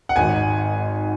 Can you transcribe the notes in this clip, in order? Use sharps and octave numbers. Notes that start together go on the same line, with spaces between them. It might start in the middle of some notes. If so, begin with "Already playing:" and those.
F#5
G#1 G#2 G#5